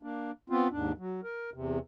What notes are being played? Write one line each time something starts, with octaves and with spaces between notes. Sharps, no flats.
A#3 D4
B3 C4 F4
D#2 G#2 D4
F#3
A#4
E2 C3